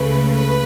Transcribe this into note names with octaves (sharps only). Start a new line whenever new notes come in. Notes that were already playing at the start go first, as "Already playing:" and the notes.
Already playing: C#2 C#3 A3 B4
B4